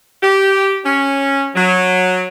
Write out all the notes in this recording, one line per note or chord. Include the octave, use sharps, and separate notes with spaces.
G4
C#4
F#3